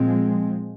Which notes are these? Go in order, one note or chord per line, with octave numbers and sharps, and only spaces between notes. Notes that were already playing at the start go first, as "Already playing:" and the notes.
Already playing: A#2 F3 G#3 C4